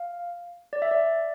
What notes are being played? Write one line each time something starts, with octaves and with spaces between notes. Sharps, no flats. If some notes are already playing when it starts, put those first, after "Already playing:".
Already playing: F5
D5
E5
D5